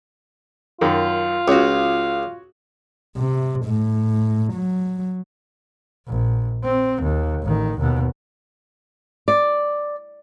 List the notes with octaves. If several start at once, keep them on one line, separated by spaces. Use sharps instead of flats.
F#2 D#3 F4
C#2 F#4 C#5
C3
A2
F#3
A#1
C4
D#2
A1 D#3
D#2 B2
D5